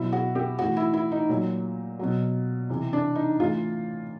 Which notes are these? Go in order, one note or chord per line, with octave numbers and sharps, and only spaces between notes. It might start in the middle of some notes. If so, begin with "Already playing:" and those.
Already playing: B2 F#3 E4
F#4
G4
A2 E3 F#4
E4
E4
D#4
A#2 F#3
B2 F#3
C3 E3
D4
D#4
A2 E3 F4